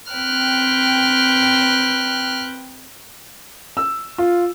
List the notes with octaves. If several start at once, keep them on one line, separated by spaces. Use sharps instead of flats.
C4 B4 G5 F6 F#6
E6
F4